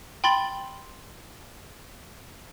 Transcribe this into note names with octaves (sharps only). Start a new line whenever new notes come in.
G5 B5 C6 A6 F#7 G7